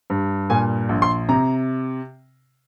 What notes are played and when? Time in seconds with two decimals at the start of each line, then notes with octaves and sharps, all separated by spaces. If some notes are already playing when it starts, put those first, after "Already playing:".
0.10 G2
0.50 A#2 G#5
0.89 A#1
1.02 C6
1.29 C3 A#5